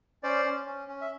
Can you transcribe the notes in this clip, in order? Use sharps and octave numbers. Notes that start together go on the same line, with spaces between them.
C#4 C5 D5
C#4
C#4
C#4
E5